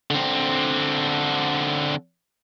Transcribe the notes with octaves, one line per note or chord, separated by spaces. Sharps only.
D3 C4